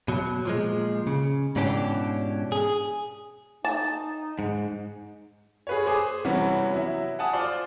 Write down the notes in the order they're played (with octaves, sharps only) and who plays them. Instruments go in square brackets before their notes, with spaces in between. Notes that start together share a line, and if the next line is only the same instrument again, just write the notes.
[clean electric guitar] B2 F#3
A#2 F3 G#3
C#3
G#2 B2 E3 C#4 D4 G4
G#4
[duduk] D#4 [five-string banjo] A5
[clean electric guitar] G#2
[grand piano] G#4 B4 C#5
G#4 C5 G#5 D6 D#6
C3 E3 G3 B3 C#4 F#4
F#3 E4
F#5 G#5 A5 D#6
F4 C5 D5